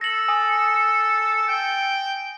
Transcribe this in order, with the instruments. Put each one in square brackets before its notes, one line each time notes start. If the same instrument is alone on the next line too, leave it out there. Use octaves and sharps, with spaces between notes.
[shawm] A4 [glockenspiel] A#6 F#7
[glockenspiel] G#5 D#6
[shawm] G5